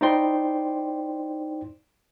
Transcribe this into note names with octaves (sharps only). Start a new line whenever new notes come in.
D#4 E4 C5 D5 G5 C6